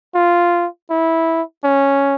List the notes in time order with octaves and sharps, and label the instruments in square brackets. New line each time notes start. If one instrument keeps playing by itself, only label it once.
[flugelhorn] F4
E4
C#4